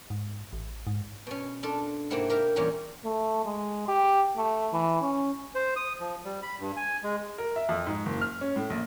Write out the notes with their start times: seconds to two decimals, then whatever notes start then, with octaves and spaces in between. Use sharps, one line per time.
0.10 G#2
0.53 A1
0.87 G#2
1.27 B2 C#4
1.63 D4 F4 A4
2.10 G#2 C3 A#3 C4 E4 F#5
2.29 G4 A#4 E5 F5
2.56 E2 A#2 G3 C#4 G4 A#4
3.05 A3
3.45 G#3
3.88 G4
4.36 A3
4.73 E3
5.02 C#4
5.55 C5
5.76 D#6
6.00 F3
6.25 G3
6.43 B5
6.60 G2
6.77 G#5
7.03 G#3
7.38 A#4
7.56 E5
7.69 F2
7.87 G#2
8.06 F#1
8.21 F6
8.41 C#4
8.56 A2
8.70 A#1